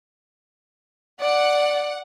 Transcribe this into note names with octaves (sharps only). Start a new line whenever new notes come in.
D5 F#5